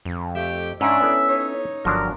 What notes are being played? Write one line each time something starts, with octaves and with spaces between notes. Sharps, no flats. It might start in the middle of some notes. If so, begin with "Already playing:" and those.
F2
A3 G4 E5
G#2 C#4 D4 E5
B3 E4 A4
D#4 C#5
G1 F3 F#3 D4 A#4